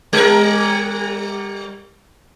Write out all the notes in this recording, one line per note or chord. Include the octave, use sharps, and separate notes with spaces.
G3 A#4